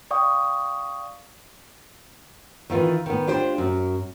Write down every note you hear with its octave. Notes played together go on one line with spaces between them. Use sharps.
D5 F5 G5 C#6 D#6
D#3 E3 F4
D#3 B3
D4 F4 G4 C5
F#2